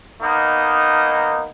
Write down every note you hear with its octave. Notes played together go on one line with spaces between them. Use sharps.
A#3 B3 D#4